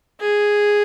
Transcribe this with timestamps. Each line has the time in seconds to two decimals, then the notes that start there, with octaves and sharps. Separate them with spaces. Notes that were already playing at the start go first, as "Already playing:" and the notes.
0.21 G#4